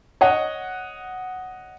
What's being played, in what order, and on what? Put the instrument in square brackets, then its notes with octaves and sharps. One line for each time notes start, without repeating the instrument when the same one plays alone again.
[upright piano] C#5 D#5 F#5